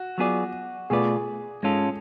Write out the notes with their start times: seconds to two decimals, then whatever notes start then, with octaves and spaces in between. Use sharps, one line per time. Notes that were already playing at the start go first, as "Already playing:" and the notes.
Already playing: F#4
0.18 F#3 B3 F4 G#4 D5
0.90 B2 A3 F4 G#4 B4 D5
1.63 G#2 G#3 C#4 F4 A4